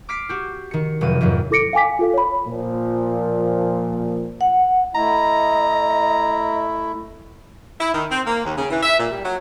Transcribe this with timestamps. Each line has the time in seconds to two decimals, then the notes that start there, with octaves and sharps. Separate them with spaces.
0.09 D6 F6 B6 C7 D7
0.29 F#4 G4
0.71 D#3 C#7
1.01 F1 F2 F#3 D#7
1.21 F2 G#2 D#3 F#3
1.51 E4 A4 D6 A#6 C#7 D7
1.73 F5 G5 G#5 D6 B6
1.99 F4 A4 F5
2.14 C#5 B5
2.48 A#2 F3
4.41 F#5
4.95 A3 E4 D#5 A#5
7.81 E4
7.93 D#3
8.11 C4
8.27 A#3
8.45 D#2
8.58 C#3
8.71 E3
8.83 E5
8.99 A#2
9.11 G3
9.24 F#3